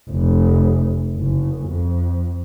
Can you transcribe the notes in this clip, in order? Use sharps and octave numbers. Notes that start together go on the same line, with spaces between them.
F1
F#1
F2